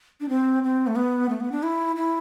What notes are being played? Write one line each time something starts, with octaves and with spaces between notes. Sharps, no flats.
D4
C4
C4
A3
B3
A3
B3
D4
E4
E4